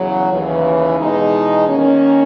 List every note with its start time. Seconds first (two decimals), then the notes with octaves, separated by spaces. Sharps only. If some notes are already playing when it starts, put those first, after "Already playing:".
Already playing: E2 C#3 F#3
0.31 D#2 C#3 E3
0.98 E2 B2 G#3 D#4
1.66 D#3 A#3 C#4